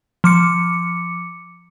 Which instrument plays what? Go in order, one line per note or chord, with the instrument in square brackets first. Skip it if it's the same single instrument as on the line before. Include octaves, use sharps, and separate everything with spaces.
[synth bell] F3 D6 C#7